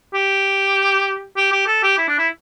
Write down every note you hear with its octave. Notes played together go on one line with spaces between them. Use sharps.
G4
G4
G4
A4
G4
E4
D4
E4